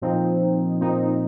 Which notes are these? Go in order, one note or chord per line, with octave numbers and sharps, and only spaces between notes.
A#2 F3 C4 D#4
A#2 F3 C4 D#4